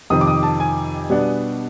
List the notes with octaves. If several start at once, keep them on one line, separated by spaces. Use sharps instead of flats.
F2 C3 D#3 D#6
D6
D#6
A5
G#5
B2 G3 B3 D4